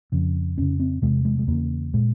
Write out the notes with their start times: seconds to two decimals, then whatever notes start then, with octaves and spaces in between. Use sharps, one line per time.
0.12 F2 C#3
0.58 F2 C#3 C#4
0.80 C4
1.02 E2 C3 G#3
1.25 G#3
1.39 G#3
1.47 E2 C#3 A#3
1.94 A#2 G#3